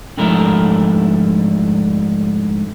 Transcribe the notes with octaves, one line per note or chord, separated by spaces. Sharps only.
F2 G#2 D3 A3 E4 A#4